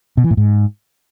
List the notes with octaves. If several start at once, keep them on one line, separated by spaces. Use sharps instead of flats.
B2
E3
A2
G#2